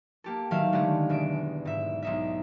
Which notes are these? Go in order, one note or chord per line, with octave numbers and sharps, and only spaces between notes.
A#3 G4 A4
A1 D#3 F#3 E5 F5
D3 G#3 A3 G4 G#4
E2 B2 G#3 E5 D7
G#2 E5
B1 D#4 E5